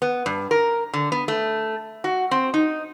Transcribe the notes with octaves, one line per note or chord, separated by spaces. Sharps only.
B3
G2
A#4
D3
B3
A3
F#4
C4
D#4